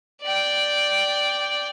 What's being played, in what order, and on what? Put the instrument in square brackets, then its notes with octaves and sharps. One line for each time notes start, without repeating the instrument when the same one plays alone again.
[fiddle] D5 G5